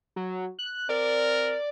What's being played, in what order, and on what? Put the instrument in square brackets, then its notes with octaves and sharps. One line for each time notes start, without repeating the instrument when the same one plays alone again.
[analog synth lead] F#3
F#6
[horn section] C4 A#4 [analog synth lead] D5